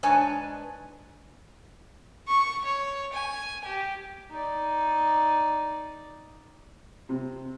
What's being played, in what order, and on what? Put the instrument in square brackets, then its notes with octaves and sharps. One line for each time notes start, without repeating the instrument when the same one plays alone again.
[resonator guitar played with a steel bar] G#2 D4 B4 C#5 G#5 A5
[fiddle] C#6
C#5
G#5
G4
[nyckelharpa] D#4 D5
[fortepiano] C3